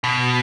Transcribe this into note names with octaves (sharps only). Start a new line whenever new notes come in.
B2